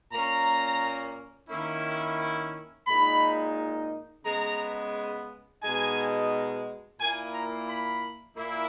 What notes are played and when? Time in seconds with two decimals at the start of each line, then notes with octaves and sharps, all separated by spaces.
0.13 A#2 A#3 C#4 A#5
1.50 D#3 A#3 C#4 E4
2.87 A#2 G#3 D#4 B5
4.25 C#3 G#3 B3 A#5
5.62 B2 G#3 D#4 G#5
6.99 A#2 A#3 E4 G#5
7.34 A#5
7.68 B5
8.37 A#2 A#3 E4